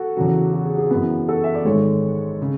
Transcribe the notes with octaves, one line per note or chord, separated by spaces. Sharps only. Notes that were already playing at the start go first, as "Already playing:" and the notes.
Already playing: F#4 A4
E2 C#3 F#3
F#4
G#4
G#4
F#2 E3 B3
F#4 A4
E5
D5
G#1 G#2 G#3 A4 C#5
C#3